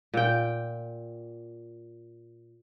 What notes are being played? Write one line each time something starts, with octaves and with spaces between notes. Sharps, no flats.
A#2 G5